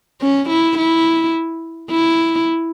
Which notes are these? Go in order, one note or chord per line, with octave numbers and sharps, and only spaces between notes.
C#4
E4
E4
E4